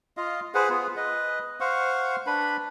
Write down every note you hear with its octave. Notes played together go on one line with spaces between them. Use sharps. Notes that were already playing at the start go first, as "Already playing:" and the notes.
F4 D#5 F5
G#4 B4 C5 F#5
B3 F4 G#4
B4 D#5
C5 F5 F#5 C#6
D4 B4 B5